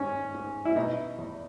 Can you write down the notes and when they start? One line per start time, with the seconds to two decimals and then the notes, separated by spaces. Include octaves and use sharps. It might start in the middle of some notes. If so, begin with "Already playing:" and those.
Already playing: G#2 C#4
0.34 G#2
0.65 E4
0.76 B2 D#4
1.18 E2